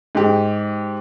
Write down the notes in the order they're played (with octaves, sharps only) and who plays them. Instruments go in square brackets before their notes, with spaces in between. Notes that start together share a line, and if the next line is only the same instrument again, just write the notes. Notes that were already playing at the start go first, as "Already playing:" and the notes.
[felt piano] G#2 G4